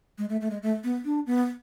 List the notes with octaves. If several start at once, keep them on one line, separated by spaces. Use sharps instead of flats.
G#3
A3
A3
G#3
A3
B3
D4
B3